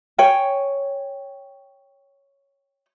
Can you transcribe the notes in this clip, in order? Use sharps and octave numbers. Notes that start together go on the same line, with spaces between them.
C#5 G5 G#5